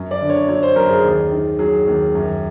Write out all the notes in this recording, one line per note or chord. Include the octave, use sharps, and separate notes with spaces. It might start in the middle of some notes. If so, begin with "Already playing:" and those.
Already playing: F#2
D5
D3
C#5
F#3 C#5
C5
F#2 A#4
G#4
D#2
D#3
F#3 G#4
D#2
F#2